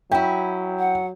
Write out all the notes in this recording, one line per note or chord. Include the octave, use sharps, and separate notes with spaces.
F#3 C#4 E4 G5
F#5